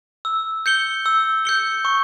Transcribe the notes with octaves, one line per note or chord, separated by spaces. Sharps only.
E6
G6 C#7 G7
E6
G6 C#7 G7
C#6